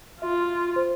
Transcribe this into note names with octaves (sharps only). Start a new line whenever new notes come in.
F4 E5
C5